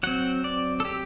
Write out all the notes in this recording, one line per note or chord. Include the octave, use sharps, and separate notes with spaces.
F#3 C4 F#5
D5
A4
G4